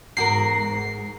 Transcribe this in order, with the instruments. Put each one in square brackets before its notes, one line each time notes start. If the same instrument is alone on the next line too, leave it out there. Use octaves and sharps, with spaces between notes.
[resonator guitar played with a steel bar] E2 F#4 A#4 [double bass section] G#2 [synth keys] C7